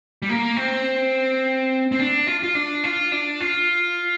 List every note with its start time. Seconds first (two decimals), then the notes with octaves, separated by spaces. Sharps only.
0.22 G3
0.29 A#3
0.57 C4
1.92 C4
1.99 D4
2.27 F4
2.43 F4
2.55 D4
2.84 F4
3.12 D4
3.41 F4